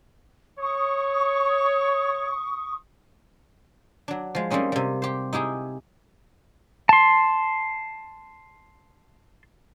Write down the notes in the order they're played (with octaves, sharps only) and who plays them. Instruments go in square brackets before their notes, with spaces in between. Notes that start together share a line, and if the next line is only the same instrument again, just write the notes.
[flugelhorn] C#5 [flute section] C#6 D#6
[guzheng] F#3 D4
F3 G#3
G3 A#3 C4 C#4 D#4
C3 G3
G4 C5
D#4 E4 G4 G#4
[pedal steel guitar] A5 C6